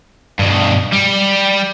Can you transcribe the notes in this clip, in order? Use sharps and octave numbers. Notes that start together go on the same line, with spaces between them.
G2 B2
G3